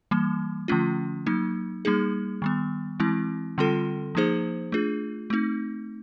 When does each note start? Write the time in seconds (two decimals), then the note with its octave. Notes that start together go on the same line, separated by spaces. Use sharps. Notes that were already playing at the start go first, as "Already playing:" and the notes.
0.11 E3 G3 A#3
0.68 D3 F3 A3 C#4 F4
1.26 F#3 A#3 D#4
1.85 G3 A#3 D#4 G#4
2.42 D#3 G3 B3
3.00 E3 G#3 C4 E4
3.58 D3 G3 C4 F4 A4
4.15 F3 A#3 D#4 G#4 C5
4.72 A3 D4 F4 G#4
5.30 A3 C4 D#4